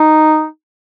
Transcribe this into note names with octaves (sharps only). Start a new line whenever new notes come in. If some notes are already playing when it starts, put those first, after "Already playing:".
Already playing: D#4